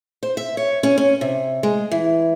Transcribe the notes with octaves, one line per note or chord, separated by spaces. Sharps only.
C5
E5
C#5
C#4
C#4
C3
G#3
E3